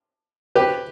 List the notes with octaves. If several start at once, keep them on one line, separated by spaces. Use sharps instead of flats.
G4 B4